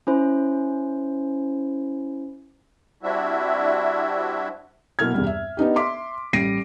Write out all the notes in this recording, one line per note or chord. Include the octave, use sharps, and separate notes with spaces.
C#4 E4 C5
G3 C4 D4 E4 F#4 E5
B2 F#3 A#3 E4 F6 G#6
E2 G2 C3 G3
E5
B3 D4 D#4 G4
E5 C6 D6 B6
A1 G3 A#6 C7 D7 D#7